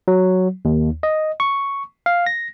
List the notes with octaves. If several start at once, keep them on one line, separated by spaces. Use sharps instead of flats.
F#3
D#2
D#5
C#6
F5
A#6